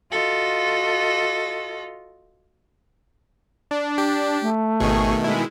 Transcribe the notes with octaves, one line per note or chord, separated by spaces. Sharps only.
F4 F#4 A4 D#5
D4
G4
A3
G#1 B2 D#3 G#4 C#6
G#3 E4